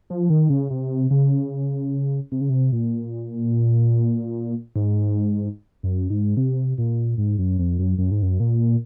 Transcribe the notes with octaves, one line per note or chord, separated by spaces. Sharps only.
F3
D#3
C#3
C3
C#3
C3
C#3
C3
A#2
G#2
F#2
G#2
C3
A#2
G#2
F#2
F2
F#2
F#2
G#2
F#2
A#2